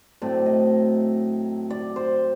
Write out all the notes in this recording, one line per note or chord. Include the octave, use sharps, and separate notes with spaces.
A2 F#3 C4 D5
D#5
D5
C5